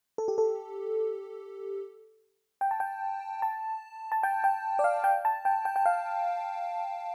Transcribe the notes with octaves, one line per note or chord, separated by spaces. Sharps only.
A4
G4
A4
G5
A5
G5
A5
A5
G5
G5
D5
F5
G5
A5
G5
G5
G5
F5